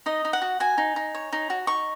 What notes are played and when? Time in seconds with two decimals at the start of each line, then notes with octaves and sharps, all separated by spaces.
0.06 D#4 D#5
0.25 D#4
0.33 F#5
0.42 F#4
0.60 F#4 G#5
0.78 D#4
0.96 D#4
1.15 C#5
1.33 D#4
1.50 F#4
1.67 D#4 C#6